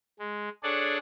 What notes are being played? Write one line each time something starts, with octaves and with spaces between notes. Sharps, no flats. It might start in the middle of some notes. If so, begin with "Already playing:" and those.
G#3
D4 G#4 A4 C#5 D5 F#5